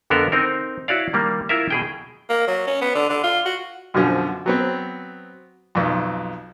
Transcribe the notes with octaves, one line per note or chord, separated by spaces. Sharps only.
F2 D3 B3 A4 A#4
C4 D#4 A#4
E4 F#4 C#5 D5 F5
D#3 G3 A#3
E4 F4 A#4 E5
B2 G#4 G5
A#3
F#3
C#4
B3
D3
D3
F4
F#4
F#2 B2 D3 F3
F#3 B3 C4
B1 F2